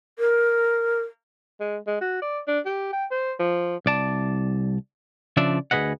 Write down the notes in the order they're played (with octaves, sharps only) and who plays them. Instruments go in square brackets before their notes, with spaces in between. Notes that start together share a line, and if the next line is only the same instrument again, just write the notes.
[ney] A#4
[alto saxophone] G#3
G#3
F#4
D5
D4
G4
G5
C5
F3
[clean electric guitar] C2 D5 A5
C#3 F3 D4 D5 E5
D2 F3 G#4 B4 D#5 F#5